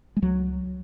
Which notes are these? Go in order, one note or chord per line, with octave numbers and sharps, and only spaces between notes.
G#3
C#2 F#3